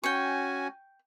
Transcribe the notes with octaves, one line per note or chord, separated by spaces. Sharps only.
C#4 F#4 G5 G#5 C#6